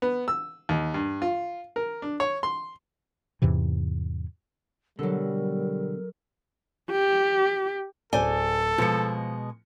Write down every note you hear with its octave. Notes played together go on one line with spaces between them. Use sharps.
B3
E6
D#2
G2
F4
A#4
D4
C#5
C6
E2 G#2 C3 E3
B2 D3 F#3 G3 A4 A#4
G4
D1 G#4 A4 C5 D5 G#5 G7
B2 F3 G#3 C#7